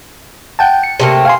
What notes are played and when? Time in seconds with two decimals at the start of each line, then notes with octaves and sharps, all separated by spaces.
0.59 F#5 G5 A5
0.83 C#7
1.00 C3 A3 A#3
1.25 F5 G#5 C6